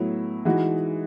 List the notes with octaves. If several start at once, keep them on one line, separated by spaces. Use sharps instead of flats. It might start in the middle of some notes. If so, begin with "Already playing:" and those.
Already playing: A2 F#3 B3 E4
E3 G#3 D#4 F#4